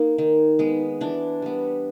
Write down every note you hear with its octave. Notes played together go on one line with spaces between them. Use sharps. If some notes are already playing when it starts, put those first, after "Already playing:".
Already playing: A#3 D#4
D#3
G#3 B3
E3 D4
G3 B3